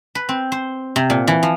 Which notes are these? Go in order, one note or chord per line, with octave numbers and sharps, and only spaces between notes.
B4
C4
C5
C3
A#2
E3
F3